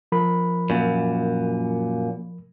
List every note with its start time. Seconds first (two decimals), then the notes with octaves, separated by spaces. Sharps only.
0.12 F3 A#4 B5
0.70 F#2 A#2